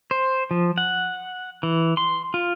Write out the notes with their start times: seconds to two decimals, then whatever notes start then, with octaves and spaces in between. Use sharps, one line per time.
0.11 C5
0.51 F3
0.78 F#5
1.63 E3
1.97 C6
2.34 F4